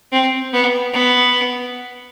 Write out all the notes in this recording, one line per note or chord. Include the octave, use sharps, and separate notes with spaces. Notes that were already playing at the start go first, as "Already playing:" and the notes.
C4
B3
B3